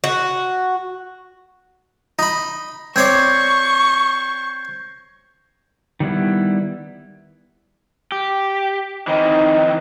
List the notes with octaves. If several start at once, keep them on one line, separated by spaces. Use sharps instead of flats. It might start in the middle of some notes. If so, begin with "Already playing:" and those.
F#4
D#4 B5 A#6
C4 C#5 D5 C#6 G6 G#6 C7
D#3 G3 B3 E4
G4
D#3 E3 C4 D#4